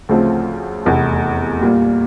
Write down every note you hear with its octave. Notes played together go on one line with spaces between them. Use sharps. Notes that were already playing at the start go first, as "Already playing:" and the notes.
D2 C#3 F3 A3 C4
F1 E2 C3
A#2 G3 A#3